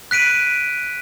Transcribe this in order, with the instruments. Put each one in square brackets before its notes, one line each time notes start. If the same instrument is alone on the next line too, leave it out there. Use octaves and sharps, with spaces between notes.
[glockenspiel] F#6 B6 D7 D#7